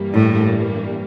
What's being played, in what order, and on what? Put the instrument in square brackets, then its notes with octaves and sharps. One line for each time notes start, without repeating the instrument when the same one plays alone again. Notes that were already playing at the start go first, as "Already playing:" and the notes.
Already playing: [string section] G2 E3 G3 A#3
[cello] A2